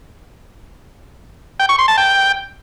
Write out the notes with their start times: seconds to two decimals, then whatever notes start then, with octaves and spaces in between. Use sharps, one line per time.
1.60 G5
1.69 C#6
1.79 C6
1.88 A5
1.98 G5